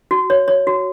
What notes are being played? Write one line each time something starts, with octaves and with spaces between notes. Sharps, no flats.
F#4
C#5
C#5
F#4